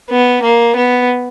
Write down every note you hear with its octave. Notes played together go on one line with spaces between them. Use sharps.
B3
A#3
B3